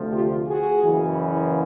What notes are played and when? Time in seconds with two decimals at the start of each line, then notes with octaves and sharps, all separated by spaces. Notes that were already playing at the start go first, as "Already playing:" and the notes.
Already playing: D2 C3 F3 A3
0.12 F4 G4
0.47 F#4 G#4
0.82 F#1 F#2 C#3 E3